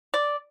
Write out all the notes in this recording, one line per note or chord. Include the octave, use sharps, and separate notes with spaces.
D5